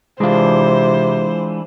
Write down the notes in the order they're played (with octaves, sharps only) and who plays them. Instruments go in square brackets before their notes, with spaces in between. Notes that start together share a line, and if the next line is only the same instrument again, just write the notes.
[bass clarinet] C3 [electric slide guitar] E3 D4 [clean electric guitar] G#3 F4 [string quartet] C5